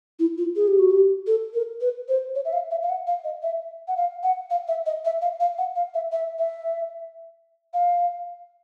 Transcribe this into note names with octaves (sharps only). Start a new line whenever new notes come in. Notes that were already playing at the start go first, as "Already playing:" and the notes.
E4
F4
G#4
G4
F#4
G4
A4
A#4
B4
C5
C#5
E5
F5
E5
F5
F#5
F5
D#5
E5
F#5
F5
F#5
F5
E5
D#5
E5
F5
F5
F#5
F5
E5
E5
E5
F5